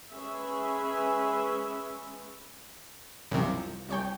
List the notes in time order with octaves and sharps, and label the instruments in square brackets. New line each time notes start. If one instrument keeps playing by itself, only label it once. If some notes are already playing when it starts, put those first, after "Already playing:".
[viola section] G#3 C#4 G#4 B4 E5
[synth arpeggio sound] C2 F3 [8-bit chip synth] F#2 C3
[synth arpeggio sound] C2 C#5 G5